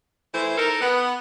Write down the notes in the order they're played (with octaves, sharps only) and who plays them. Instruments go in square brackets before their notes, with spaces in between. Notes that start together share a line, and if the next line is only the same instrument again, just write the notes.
[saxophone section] E3 A3 E4 C5
D#4 A4 A#4
B3